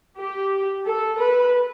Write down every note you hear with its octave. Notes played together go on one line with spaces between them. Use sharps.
G4
A4
B4